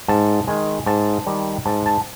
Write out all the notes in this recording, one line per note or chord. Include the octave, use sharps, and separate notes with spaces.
G#2 A5
D#3 G#3 G#5
G#2 A5
D#3 G3
G#2 A5
A5